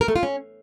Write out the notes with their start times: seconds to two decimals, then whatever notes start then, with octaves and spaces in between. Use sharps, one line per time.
0.01 A#4
0.08 A3
0.16 F4
0.23 C#4